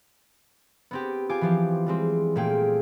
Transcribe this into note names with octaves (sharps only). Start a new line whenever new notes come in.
B3 C4 G4
F4 G4 G#5 D6
E3 F3 G4
G3 G#3 C4
A#2 A3 A#3 G#4 G5